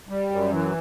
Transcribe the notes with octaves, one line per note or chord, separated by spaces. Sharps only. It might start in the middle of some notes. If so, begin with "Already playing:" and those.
G3
F#2
E3